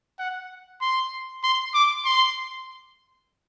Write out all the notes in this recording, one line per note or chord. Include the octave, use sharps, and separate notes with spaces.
F#5
C6
C6
D6
C6